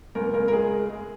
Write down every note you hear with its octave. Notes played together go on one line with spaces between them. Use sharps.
C#2 A#4
C#2 A#4
A#4
G#3 G#4
G#3
G#3